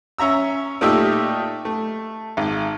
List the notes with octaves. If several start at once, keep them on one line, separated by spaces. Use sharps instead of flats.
C#4 E5 A#5 E6
A#2 A3 D#4 G4 E5 E6
A3
G#1